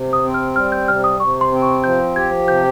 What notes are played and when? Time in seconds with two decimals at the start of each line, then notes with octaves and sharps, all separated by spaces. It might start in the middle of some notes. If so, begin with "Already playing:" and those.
Already playing: C3
0.13 D#6
0.25 C4
0.34 F6
0.56 G3 F6
0.72 G6
0.88 C3 F6
1.04 D#6
1.20 C3 C#6
1.41 C6
1.52 C4
1.62 C#6
1.84 F3 G6
2.16 G4 G#6
2.48 C3 G6